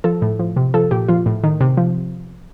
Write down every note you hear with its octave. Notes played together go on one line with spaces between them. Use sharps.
F3 A4
A2
F3
C3
F3 A4
A#2 G4
F3 F4
A2
D#3
C3
F3